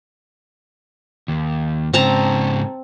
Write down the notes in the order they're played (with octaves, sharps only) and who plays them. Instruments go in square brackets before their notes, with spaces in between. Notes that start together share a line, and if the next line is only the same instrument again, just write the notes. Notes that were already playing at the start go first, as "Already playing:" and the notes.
[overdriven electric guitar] D#2
[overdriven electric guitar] G#2 C#3 [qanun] C4 A5 A#5